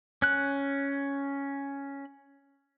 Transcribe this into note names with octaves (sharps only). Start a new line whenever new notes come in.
C#4 F#6